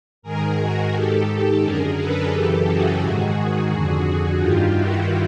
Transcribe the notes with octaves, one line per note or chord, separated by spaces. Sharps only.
G#2 D#3 G#4 A#4
F#4 G#4
G#2 D#3 G4 A4
F#2 D3 G#4 A#4
A4 B4
F#2 C#3 E3 G4 A4
F#4 G#4
G#2 D#3
F2 D3
G2 D#3 F4 G4
E4 F#4